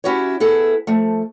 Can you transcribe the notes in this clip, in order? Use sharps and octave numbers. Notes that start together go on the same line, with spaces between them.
C#4 E4 F#4 G4 C#5
B3 E4 G#4 A4
F3 A3